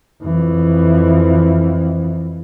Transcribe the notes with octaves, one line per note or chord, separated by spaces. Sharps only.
F2 E3